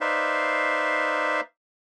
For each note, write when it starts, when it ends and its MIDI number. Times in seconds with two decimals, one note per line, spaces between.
0.01 1.41 63
0.01 1.41 71
0.01 1.41 72
0.01 1.41 74
0.01 1.41 76
0.01 1.41 77